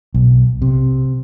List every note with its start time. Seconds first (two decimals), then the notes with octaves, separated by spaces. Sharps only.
0.14 B1
0.62 C3